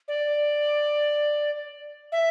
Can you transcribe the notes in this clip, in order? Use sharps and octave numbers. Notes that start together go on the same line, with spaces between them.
D5
E5